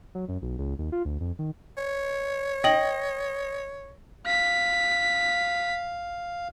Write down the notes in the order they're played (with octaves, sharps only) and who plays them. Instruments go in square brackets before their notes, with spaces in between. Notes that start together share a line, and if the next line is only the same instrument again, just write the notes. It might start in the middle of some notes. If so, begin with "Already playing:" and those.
[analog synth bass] F#3
F#2
B1
C#2
D#2
F4
D2
F2
D#3
[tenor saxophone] C#5
[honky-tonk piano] D#5 A#6 [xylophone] G5 F#7
[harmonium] F5 [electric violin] B6